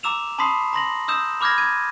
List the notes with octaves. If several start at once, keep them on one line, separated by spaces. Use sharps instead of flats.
A#5 D6 E6 E7 F7
A5 B5 C6 D#6 B6 C7
A#5 C6 A#6 F#7
D#6 E6 G6 E7
B5 D6 F6 G6 G#6 A#6
G#6 D#7